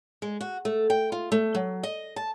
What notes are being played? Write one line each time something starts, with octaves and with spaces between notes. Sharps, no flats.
G#3
F#4
A3
G5
F4
A3
F#3
D#5
A5